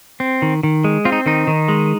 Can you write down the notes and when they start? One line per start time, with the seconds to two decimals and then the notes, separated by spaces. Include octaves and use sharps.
0.20 C4
0.42 D#3
0.63 D#3
0.84 G#3
1.05 C4 F4
1.12 D#4
1.26 D#3 D#4
1.47 D#3
1.68 G#3